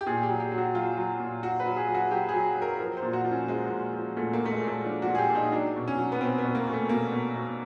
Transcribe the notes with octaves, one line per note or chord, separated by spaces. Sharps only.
G4
A#2 G#4
G4
F#3
G4
F#3
F#4
F#3 F4
F#3
A#2
F#3 F#4
B4
F#3
G#4
F#3
F#4
F#3 G4
G#4
F#3
F#3
A#4
F3 A#4
C5
A#2
F#4
F3
C#4
F3 G#3
A#2
F3
A#2 A3
A#2 A#3
A3
G#3
A#2
A3
F3 D4
F#4
A#2
G#4
G4
A#2
D#4
F#3 D4
B2
C#4
F#3
B3
B2 C4
B3
B2
A#3
B2
A3
B2 A#3
B2
B2